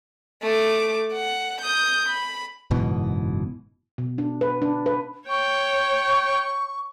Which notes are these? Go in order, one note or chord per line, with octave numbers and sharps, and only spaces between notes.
A3 D6
F#5
D#6 G6
B5
F#1 G#2 B2 E3
B2
D4
B4
D4
B4
C#5 G5 C#6